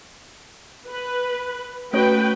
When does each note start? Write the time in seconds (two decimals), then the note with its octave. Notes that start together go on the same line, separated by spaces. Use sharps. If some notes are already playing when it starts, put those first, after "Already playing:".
0.89 B4
1.93 A3 C#4 F#4 B4 C#5 G5